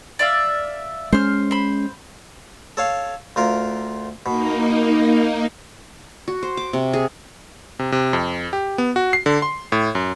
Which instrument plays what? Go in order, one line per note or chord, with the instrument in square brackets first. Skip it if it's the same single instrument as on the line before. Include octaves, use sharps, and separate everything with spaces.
[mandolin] D5 E5 F5
[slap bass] G#3 C#4 [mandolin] C5 F6
[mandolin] C5 B5
[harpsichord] A4 C#5 F5
D2 F4 A#4
[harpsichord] B2 [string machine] A#3 D#4
[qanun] F#4
C5
D6
C3
G#4
[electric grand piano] C3
C3
F2
G4
B3
F#4
C7
D3
C6
A2
F#2